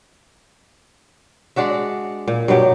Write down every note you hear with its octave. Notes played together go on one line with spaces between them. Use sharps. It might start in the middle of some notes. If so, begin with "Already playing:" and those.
G#3 D4 F#4 E5
A#2
G2 B2 F#3 G4